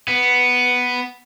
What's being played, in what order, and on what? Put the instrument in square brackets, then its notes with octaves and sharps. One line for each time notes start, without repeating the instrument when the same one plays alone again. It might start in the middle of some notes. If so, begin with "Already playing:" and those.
[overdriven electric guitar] B3